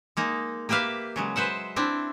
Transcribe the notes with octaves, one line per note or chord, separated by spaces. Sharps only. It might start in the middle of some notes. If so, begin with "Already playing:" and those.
G#3 A#3 D#4
A#3 G4 B4 E5 F5
C#3 F#3 G#3
B4 C5 E5 F#5
C4 D4 E4